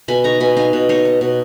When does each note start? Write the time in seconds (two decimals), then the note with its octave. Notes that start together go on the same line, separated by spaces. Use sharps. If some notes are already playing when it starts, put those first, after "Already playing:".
0.08 B2 G#5 B5
0.24 D#4 A#5 C#6
0.40 B2 G#5 B5
0.57 D#4 F5 G#5
0.73 B2
0.89 D#4 C#5 F5
1.05 D#4
1.21 B2